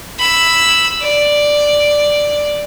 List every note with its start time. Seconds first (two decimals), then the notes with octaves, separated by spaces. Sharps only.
0.19 B5 E6
1.02 D5